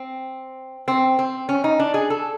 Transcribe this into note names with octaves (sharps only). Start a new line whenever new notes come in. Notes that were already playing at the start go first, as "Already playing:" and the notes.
Already playing: C4
C4
C4
C#4
D#4
D4
G#4
A4